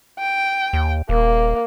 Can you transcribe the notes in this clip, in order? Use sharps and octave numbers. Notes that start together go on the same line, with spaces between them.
G5
D#2
D#1 A#3